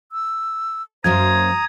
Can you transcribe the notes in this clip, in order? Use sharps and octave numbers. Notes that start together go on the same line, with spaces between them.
E6
F#2 F#3 A#3 C5 A#5 D#6 G#6